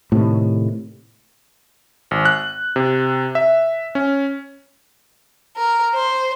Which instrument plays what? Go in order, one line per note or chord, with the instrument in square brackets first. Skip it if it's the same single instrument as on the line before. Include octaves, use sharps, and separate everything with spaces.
[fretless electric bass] A2 C3 D#3
[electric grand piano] G#1
F#6
C3
E5
C#4
[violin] A#4
C5